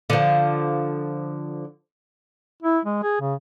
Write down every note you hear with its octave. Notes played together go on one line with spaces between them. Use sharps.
D3 F3
E4
G#3
G#4
C#3